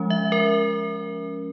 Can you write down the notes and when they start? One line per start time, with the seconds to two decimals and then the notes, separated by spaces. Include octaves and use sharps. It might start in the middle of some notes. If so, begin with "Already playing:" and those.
Already playing: F3 G#3 C#4
0.10 E5
0.32 A#4